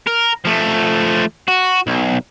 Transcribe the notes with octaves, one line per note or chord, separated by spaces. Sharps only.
A#4
F3 A3
F#4
B1